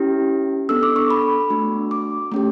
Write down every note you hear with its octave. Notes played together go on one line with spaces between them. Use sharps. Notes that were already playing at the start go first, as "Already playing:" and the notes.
Already playing: C#4 E4 G4
B3 D4 A4 E6
D6
C#6
B5
A3 D4 F#4
D6
A3 C#4 G4